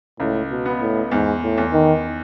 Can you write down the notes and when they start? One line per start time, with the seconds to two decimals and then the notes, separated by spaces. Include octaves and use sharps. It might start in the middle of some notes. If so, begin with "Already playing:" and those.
0.20 C#2 A2
0.51 B2
0.66 B3
0.81 A2
1.11 E2 G#2
1.43 A2
1.58 E2
1.73 D#3